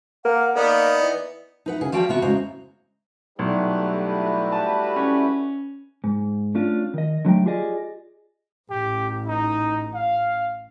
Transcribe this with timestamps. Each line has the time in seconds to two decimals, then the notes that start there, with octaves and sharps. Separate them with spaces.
0.25 A#3 F#5
0.56 A#3 B3 D#4 D5
1.02 E3
1.66 D#4 B4 F#5
1.81 C#3 G#4
1.92 F3 G3 F#4 F5 G5 A5
2.09 C3 B3 F#4
2.22 A2 C#3 G#3 C5 A#5
3.39 B1 G3 A3 E4 F#4 G4 B4
4.52 A5
4.96 C#4
6.04 G#2
6.55 A3 C#4 D4 F4
6.94 D#3 D#5
7.25 D3 F#3 A3 G5
7.46 F4 G4 G#4 D5 D#5
8.71 A1 G4
9.27 D#4
9.94 F5